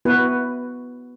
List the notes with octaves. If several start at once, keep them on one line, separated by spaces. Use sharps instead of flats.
B3 E4 F#4 B4